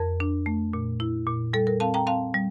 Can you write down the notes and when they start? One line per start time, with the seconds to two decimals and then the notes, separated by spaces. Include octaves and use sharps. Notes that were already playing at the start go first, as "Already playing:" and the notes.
Already playing: F2 A#4
0.20 D4
0.46 A3
0.73 A#2
1.00 E4
1.27 A#2
1.53 G3 A4
1.67 A#4
1.80 C4 F5 A5
1.94 G5 A#5
2.07 C4 F5 A5
2.34 G3